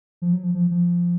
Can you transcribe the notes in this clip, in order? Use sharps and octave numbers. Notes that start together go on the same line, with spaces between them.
F3
F#3
F3
F3
F3